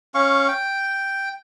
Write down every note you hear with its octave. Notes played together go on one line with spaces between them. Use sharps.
C#4 F5 C#6
G5